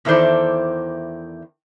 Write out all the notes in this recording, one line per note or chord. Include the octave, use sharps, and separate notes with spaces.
E2 D#3 E4 A4 C5 D5